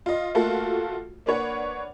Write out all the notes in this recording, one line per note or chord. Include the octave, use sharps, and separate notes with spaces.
F4 D#5
A3 A#3 F4 F#4 A4
A#3 D4 B4 C#5 F#5